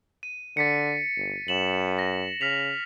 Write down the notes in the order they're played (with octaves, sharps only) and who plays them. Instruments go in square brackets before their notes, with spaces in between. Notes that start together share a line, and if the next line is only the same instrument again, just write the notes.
[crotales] D#7
[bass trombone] D3 [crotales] A6 B6 C#7
[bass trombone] G1
[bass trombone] F#2 [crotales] E7 F#7
[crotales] A#6
[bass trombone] C#3 [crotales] F6 B6 F7